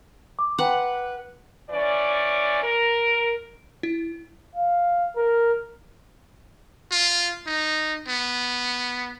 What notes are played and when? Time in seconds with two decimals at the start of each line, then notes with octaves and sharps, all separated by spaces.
0.39 D6
0.59 B4 F#5 G5 A#5 C6
1.70 E3 C#4 D5
2.63 A#4
3.83 E4
4.56 F5
5.17 A#4
6.92 F4
7.47 D#4
8.08 B3